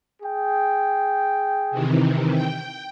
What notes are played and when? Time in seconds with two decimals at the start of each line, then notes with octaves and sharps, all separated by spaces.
0.21 G#4 G5
1.71 C3 D#3 E3
2.33 G5